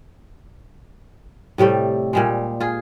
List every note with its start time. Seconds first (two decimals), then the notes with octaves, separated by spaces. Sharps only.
1.58 A2 C3 G3 A3
2.13 A#2 G3 G#3
2.60 F4 G#4